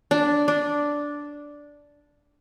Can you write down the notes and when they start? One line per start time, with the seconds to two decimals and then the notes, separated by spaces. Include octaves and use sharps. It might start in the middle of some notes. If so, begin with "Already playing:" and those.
0.11 D4
0.48 D4